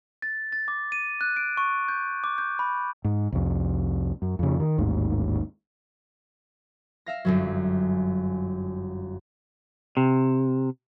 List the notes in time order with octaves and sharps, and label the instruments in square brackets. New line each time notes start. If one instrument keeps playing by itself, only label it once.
[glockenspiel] A6
A6
D6
D#7
F#6
D7
C#6
G6
D6
G6
B5
[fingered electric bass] G#2
C2 F2
F#2
F2 C#3
D#3
A1 D#2 G#2
[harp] E5 F5 A#6
G1 F#2 F#3
[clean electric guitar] C3